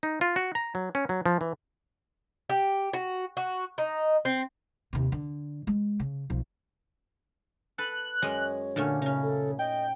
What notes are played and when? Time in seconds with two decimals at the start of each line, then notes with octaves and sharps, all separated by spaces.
0.03 D#4
0.21 F4
0.36 F#4
0.55 A#5
0.75 F#3
0.95 C#4
1.09 F#3
1.26 F3
1.41 E3
2.50 G4
2.93 F#4
3.37 F#4
3.78 D#4
4.25 C4
4.93 D#2 C3
5.12 D3
5.67 G#3
6.00 C#3
6.30 B1 F3
7.78 A4 B4 F#6
8.22 F#2 G#3 C#5 D#5
8.76 A#2 D3 A3 C#4
9.02 C#3 C#4 D#4
9.23 A4
9.59 D#5 G5